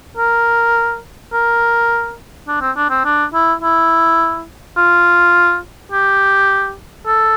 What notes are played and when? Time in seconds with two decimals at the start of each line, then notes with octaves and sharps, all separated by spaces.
0.17 A#4
1.33 A#4
2.48 D4
2.61 C4
2.77 D4
2.90 C4
3.05 D4
3.34 E4
3.63 E4
4.77 F4
5.92 G4
7.07 A4